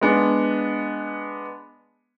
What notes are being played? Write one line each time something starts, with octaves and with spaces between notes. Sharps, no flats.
G#3 B3 D4